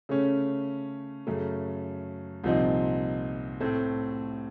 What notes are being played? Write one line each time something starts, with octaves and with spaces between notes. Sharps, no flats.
C#3 A3 C#4
F#2 C#3 A3
C2 A#2 F3 C4 D#4
A2 A3 C4